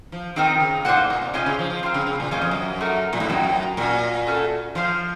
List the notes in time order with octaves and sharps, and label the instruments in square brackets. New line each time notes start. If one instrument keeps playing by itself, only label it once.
[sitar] F3
[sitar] D#3 [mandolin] C4 D#4 A#4
[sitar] C#3
[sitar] A#2 [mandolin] A#3 F4 C5 F#5
[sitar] A2
A#2
C3
[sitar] C3 [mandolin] C#4 F4 C5 D#5
[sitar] C#3
F3
F3
[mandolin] C4 F4 A#4 F5
[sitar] C#3
C#3
A#2
[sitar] F#2 [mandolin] C#4 F4 C5 D#5
[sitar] F2
F#2
[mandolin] A3 D#4 F#4 A#4
[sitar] A#2
A2
[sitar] F#2 [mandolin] C4 D#4 F#4
[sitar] A#2 [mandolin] C#4 F#4 A#4
[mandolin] A3 C#4 F#4 A4
[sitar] F3 [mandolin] F4 C5 F5